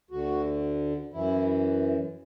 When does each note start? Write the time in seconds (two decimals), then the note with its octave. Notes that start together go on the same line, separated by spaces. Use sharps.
0.10 D2 D3 F#4
1.13 F#2 E3 E4